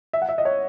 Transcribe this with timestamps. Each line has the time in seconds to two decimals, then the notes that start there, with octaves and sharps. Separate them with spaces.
0.13 E5
0.22 F#5
0.29 E5
0.38 D#5
0.45 C#5